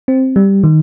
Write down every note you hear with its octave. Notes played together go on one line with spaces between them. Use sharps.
C4
G3
D#3